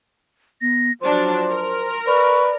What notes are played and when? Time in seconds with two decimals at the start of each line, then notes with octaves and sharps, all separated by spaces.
0.61 B3 A#6
1.01 F3 F#3 D4 C5 C6
1.49 A#4
2.07 B4 D5 C#6